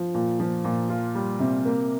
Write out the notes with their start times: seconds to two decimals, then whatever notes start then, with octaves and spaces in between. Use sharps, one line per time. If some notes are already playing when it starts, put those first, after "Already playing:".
Already playing: F3
0.14 A#2
0.40 F3
0.64 A#2
0.90 F4
1.15 G3
1.40 C3
1.65 A#3